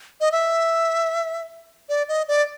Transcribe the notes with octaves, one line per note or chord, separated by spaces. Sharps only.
D#5
E5
D5
D#5
D5